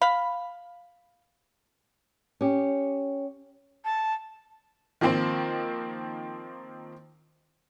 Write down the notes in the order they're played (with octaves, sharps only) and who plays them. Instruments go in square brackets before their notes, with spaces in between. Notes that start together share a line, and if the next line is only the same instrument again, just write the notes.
[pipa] F5 B5
[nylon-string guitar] C#4 G4
[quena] A5
[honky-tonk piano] D#3 F3 A#3 C4 C5